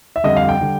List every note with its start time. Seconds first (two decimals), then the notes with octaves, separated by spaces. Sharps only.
0.16 E5
0.24 F2 D3 G3 D#5
0.37 F5
0.49 G5
0.61 D3 G3